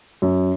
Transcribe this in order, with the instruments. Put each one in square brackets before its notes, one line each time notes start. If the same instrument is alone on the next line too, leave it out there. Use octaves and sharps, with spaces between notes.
[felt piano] F#2